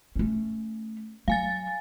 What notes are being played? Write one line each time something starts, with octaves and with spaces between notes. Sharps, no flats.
A3 C#4
F#3 F5 G#5 A6